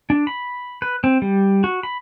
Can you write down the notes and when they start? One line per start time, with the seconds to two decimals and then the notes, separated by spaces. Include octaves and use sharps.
0.10 D4
0.27 B5
0.82 B4
1.04 C4
1.22 G3
1.64 F#4
1.83 B5